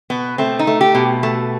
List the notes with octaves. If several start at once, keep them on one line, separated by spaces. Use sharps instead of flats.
B2 B3
A3 C4
D#4
A3
G4
B2
A3